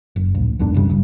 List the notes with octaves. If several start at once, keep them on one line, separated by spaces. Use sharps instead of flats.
F#1
D1 A#1
B1 E2 G#2 D4
F#1 C2 G2 C#3
F#1 G2